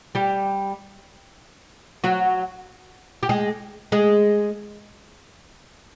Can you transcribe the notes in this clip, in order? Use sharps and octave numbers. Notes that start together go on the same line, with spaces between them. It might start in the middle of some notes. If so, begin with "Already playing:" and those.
G3 G4
F#3 F#4
G4
G#3 G#4
G#3 G#4